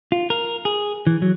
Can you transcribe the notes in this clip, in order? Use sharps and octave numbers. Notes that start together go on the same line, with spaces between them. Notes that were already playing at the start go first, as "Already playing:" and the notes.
F4
A#4
G#4
E3
F#3